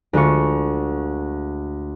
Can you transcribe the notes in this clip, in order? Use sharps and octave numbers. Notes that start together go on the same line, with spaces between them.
D2 G#3 F4 C#6